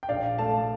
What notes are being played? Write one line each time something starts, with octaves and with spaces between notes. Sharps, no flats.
G5
A#1 D5 F5
A3 F5 A5